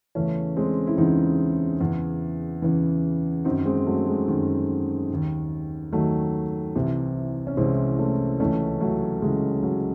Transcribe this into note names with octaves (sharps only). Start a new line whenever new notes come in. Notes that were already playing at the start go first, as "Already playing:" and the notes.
E2 C#3 E3 A3 C#4
G#3 C4
E4
E2 C#3 E3 C4 D#4
E2 C#3 E3
E2 C#3 E3
F#2 D#3 C4 D#4
G#3 C4
F#3 A3
G#3
F#2 D#3
D#2 D#3
D#2 D#3 F#3 A3
C2 C3 E3
C#4
C2 C3 E3 G#3 C4
A3 C#4
C#2 C#3 E3 A3 C#4
F#3 A3
C#2 C#3 E3 G#3
F#3